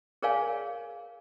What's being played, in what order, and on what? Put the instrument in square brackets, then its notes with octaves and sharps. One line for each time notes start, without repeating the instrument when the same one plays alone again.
[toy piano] G#4 A#4 C#5 D5 F5 G#5